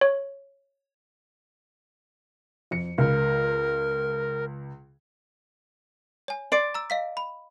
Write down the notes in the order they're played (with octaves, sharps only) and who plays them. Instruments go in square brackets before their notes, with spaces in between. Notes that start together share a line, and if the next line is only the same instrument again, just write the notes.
[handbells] C#5
[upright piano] F2 C#7
[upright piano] C#2 [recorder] A#4
[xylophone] C#5 G#5
[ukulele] D5 [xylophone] C6 C7 D7
[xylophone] A#5 E6
D#5 F5 B6
B5